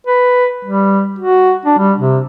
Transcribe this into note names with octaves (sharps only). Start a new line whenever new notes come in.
B4
G3
F#4
D4
G3
C3